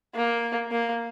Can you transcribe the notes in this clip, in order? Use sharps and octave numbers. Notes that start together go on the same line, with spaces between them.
A#3
A#3